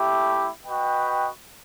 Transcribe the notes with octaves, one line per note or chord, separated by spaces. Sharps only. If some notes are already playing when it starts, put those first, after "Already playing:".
Already playing: A3 E4 G4
F#4 B4 D#5 G5